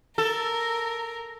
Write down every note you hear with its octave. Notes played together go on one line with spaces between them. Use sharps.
A4 A#4